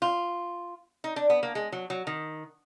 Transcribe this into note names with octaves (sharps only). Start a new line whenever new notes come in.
F4
D#4
D4
B3
A#3
G#3
F#3
F#3
D#3